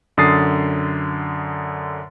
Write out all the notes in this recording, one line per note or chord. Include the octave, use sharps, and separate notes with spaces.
F#2 D3 D#6 A6 C7